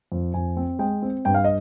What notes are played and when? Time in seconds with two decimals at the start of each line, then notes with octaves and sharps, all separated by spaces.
0.12 F2
0.34 F2 G#5
0.57 C4
0.79 G#3 G5
1.02 C4
1.25 G2 G5
1.34 F5
1.44 D#5